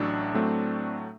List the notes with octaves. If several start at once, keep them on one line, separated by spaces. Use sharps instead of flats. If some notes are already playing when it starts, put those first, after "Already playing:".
Already playing: A1 A2 F#3 A3 D4
A2 F#3 A3 C4